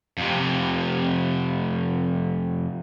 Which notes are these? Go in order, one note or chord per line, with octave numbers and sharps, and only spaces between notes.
F2 C3